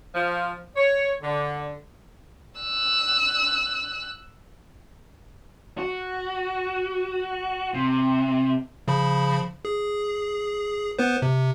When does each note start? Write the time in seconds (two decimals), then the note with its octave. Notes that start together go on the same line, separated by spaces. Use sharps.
0.15 F3
0.76 C#5
1.21 D3
2.61 E6 F#6
5.78 F#4
7.74 C3
8.88 C#3 F3 B5
9.65 G#4
10.99 B3 B4 C5
11.22 C3